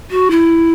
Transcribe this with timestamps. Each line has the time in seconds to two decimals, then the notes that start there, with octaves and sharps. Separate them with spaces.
0.11 F#4
0.30 E4